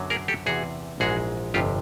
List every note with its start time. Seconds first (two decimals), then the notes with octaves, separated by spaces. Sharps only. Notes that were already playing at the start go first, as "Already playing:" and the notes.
Already playing: F#2 D3 F#3 B3
0.10 G#4 A#4
0.28 G4 A4
0.46 E2 C3 E3 F#4 G#4
1.00 A#1 G#2 E3 G#3 F#4 G#4
1.54 G1 F2 C3 F4 G4